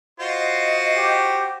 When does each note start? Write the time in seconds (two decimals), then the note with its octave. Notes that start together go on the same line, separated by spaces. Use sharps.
0.20 F4 F#4 C5 D#5
0.97 G4